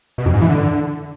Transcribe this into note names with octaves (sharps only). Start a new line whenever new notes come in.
B2
F2
G#2
E3
D3